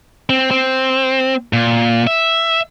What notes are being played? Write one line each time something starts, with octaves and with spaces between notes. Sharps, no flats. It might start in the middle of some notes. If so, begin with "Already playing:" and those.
C4
C4
A#2
E5